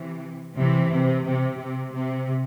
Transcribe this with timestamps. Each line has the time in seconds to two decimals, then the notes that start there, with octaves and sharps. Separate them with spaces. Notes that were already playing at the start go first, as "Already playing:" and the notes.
Already playing: C3 E3
0.55 C3 E3
0.89 C3
1.24 C3
1.58 C3
1.92 C3